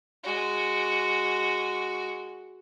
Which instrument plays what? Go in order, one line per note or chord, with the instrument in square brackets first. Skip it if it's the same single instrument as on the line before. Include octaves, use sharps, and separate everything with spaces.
[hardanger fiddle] G#3 F#4